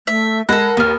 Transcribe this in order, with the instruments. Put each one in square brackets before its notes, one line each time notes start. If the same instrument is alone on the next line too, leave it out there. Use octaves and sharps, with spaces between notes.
[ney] A3 [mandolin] E5
[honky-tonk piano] G#3 B5 A#6 [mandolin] A4 F#5 [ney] A#4
[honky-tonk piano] D#2 [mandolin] B3 F6